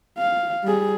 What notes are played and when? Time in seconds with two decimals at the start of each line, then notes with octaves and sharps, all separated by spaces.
0.18 F5
0.64 G3 G#4